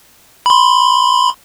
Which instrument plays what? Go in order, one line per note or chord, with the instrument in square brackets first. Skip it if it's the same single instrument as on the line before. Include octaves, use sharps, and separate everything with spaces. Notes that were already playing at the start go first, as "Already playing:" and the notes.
[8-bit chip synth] B5 C6